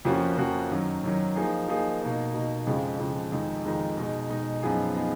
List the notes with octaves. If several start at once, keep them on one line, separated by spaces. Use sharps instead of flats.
F2 F3 A#3 C#4 F#4
F2 F3 A#3 C#4 F#4
F#2 D#3 F#3
F#2 D#3 F#3
F3 A#3 D#4 G#4
F3 A#3 D#4 G#4
B2 A#3 D#4
B2 A#3 D#4
F2 C#3 F3 G#3
F2 C#3 F3 G#3
F2 D#3 G#3 D#4
F2 D#3 G#3 D#4
B2 G#3 D#4
B2 G#3 D#4
F#2 F3 B3 D#4 G#4
F3 B3 D#4 G#4